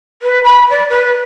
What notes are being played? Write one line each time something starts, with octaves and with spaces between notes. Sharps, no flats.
B4
B5
D5
B4